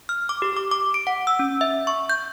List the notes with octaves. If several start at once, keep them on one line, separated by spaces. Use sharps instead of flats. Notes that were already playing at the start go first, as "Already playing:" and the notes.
F6
D6
G4
D6
D6
D7
F#5
E6
C#4
E5
C#6
G6